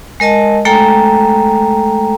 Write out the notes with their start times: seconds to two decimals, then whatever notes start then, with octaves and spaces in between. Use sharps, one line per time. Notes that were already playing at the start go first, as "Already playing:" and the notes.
0.20 G#3 A#4 D#5 A5
0.65 G#3 A3 A4 G5 A#5